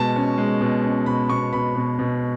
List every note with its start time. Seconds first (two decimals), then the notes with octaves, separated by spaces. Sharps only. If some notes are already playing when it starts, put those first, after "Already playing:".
Already playing: B2 G#3 A5
0.16 C#4
0.38 G#3
0.61 B2
0.84 C#4
1.06 B2 B5
1.29 B2 C#6
1.53 B2 B5
1.75 B2
1.99 B2